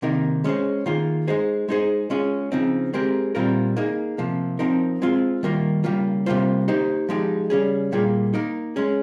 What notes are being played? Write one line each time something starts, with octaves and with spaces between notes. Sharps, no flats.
C3 D#3 A#3 D#4 A#4
G#3 C#4 G#4 C5
D#3 A#3 F4 G#4
G#3 D#4 G#4 C5
G#3 D#4 G#4 C5
G#3 C#4 F4 G#4
C#3 F3 C4 D#4
G#3 C4 G4 A#4
A#2 G3 C4 F4 A#4
A#3 D#4 G#4
C3 F3 A#3
F3 C4 D#4 A#4
G#3 C4 F4
D#3 G3 A#3 F4 A#4
C#3 G3 A#3 F4
C3 G3 A#3 F4 C5
A#3 D#4 G4 C5
F3 G#3 D#4 G4
C#3 G3 C#4 G#4
A#2 G3 A#3 F4 G#4
A#3 D#4 A#4
G#3 C#4 G#4